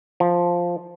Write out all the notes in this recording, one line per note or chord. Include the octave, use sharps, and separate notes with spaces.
F3